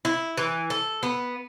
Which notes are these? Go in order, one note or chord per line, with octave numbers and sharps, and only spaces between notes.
E4
E3
A4
B3